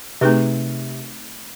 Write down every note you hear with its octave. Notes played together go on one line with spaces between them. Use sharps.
C3 A3 C4 D#4 G#4 B4